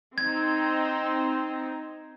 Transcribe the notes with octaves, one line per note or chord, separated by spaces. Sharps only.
C4 D#4 G#6